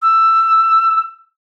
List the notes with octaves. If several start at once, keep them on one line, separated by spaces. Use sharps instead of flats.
E6